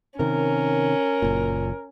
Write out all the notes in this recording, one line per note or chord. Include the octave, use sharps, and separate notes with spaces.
C3 D#3 C#4 A#4
F#1 A#2